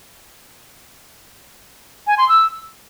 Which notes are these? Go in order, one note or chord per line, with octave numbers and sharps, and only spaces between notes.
G#5
C6
E6